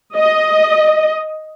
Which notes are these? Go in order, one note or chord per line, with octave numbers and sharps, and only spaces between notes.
D#5